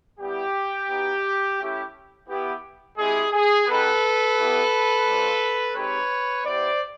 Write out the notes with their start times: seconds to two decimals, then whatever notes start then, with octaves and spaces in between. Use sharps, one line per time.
0.20 G3 B3 E4 G4
0.89 B3 D#4 F#4
1.59 A3 C#4 E4 G4
2.28 B3 E4 G4
2.98 G#3 C4 E4 G4 G#4
3.32 G#4
3.67 B3 D#4 G4 A4 B4
4.37 B3 E4 G4
5.07 G3 C4 F4
5.75 G#3 C4 D#4 G4 B4 C#5
6.45 B3 E4 G4 C5 D5